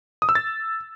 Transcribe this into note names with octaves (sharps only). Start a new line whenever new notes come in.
D#6
E6
A6